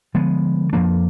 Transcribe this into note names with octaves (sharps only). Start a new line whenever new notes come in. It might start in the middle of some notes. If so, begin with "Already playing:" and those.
D3 F3 G#3 B3
F2 F3 A#3 D4